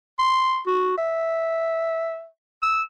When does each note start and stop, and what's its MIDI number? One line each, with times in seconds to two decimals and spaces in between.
0.19 0.61 84
0.66 0.95 66
0.98 2.27 76
2.63 2.82 88